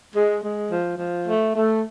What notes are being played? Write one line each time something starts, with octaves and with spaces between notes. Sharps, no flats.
G#3
G#3
F3
F3
A3
A3